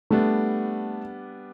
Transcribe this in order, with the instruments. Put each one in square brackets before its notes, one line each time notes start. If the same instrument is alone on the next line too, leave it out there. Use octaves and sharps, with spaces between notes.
[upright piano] G3 B3 D4 [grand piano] A3